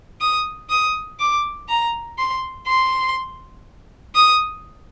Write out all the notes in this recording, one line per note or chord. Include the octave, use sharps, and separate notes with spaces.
D#6
D#6
D6
A#5
C6
C6
D#6